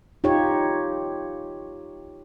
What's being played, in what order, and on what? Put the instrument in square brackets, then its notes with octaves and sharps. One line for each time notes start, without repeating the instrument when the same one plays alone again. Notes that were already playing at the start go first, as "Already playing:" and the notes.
[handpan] D#4 F4 G4 C#5